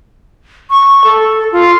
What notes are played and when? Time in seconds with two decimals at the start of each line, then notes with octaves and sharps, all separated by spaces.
0.70 C#6
1.04 A4
1.52 F4